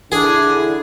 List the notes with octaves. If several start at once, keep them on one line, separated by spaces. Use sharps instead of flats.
D3 D4 E4 G#4